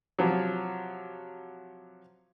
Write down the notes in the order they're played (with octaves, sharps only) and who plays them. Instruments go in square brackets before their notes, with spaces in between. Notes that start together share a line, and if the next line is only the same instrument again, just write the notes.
[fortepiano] C3 F3 F#3